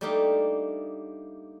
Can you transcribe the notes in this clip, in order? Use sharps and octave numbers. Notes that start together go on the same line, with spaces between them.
G3 A3 A#3 D4 D#4 F5